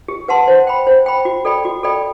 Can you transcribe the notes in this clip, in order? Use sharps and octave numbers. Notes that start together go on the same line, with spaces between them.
G4
B4 F#5 A5 C6
C5
G5 B5
C5
G5 B5
F#4
A4 D5 G5 B5
F#4
A4 D5 G5 B5